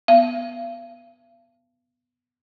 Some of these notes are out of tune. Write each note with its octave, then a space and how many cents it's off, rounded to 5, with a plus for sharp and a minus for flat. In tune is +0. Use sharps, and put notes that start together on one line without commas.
B3 +0 F5 -40